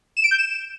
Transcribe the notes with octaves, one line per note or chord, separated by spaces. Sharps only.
E7
D7
G6
E7